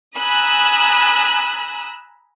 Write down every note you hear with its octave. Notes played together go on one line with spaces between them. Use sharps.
G#5 A#5 B5 D#6 E6 F#6